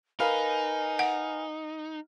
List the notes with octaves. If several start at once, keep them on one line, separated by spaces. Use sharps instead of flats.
D#4 A#4 B4 F5 G#5
F#5